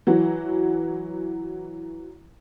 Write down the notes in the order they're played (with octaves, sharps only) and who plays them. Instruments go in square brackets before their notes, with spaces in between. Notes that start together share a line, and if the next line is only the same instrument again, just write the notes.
[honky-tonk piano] E3 F#3 F#4